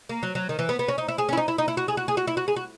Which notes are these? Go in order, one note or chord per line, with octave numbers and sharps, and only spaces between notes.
A#3
F#3
F#3
D#3
E3
B3
B3
C#4
D#4
E4
G#4
C#4
E4
D#4
E4
D#4
E4
F#4
G#4
F#4
G#4
F#4
E4
F#4
G#4
F#4